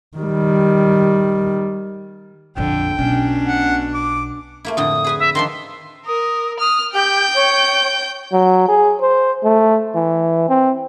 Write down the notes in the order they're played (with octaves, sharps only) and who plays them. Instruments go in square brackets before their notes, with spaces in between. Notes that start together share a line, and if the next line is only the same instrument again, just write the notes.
[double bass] D#3 G3
[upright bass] A#1 F2 [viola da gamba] D3 [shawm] G5
[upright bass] B1 [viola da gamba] B2 D4 [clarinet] C#4
[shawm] F#5
D6
[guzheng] A3 A#3 E4
[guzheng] F2 A2 D3 [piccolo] D#6
[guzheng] G#4 B4 G#5
[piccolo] E5
[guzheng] D#3 F3 D4 [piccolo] C6
[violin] A#4 [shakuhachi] D#6
[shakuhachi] D#6 [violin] F6
[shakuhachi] G4 [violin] G5 G6
[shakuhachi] C#5
[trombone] F#3
G#4
C5
A3
E3
C4